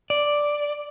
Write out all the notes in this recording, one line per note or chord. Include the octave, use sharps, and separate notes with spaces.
D5